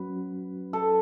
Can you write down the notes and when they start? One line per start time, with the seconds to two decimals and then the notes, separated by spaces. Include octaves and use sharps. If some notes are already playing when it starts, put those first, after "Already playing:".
Already playing: F#3 C#4 F#4 B4
0.73 A4